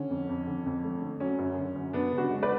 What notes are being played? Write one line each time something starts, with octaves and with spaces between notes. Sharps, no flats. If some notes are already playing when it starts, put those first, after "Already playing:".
Already playing: D3 C#4
F2
F2
D3
F2
A3
D3
F#3 C#4
F#2
D3
F#2
F#2 B3 D4
C#3
D4 F#4
G#3
B4 D5